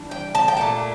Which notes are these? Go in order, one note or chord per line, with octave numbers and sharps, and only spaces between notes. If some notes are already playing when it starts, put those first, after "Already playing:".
Already playing: E3 G3 D4
G5
A5
G5
A#2 A3 D4 A5